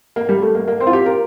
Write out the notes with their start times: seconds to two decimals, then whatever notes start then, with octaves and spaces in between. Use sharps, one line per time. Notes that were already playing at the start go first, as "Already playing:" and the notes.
0.16 A#3
0.29 G3
0.42 A3
0.55 A#3
0.68 A#3
0.80 C4
0.87 F4
0.93 G4
1.06 A#4